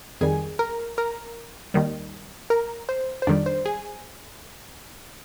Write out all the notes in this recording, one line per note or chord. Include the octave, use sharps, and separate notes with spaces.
F2 D#3 G3 G#4 G#5
A#4 A#5
A#4 A#5
D#2 D#3 G3
A#4 A#5
C5
C5
F2 D#3 G3 D4 D5
C5
G#4 G#5